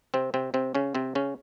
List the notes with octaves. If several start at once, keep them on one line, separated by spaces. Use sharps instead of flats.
C3 C4
C3 C4
C3 C4
C#3 C#4
C3 C4
C#3 C#4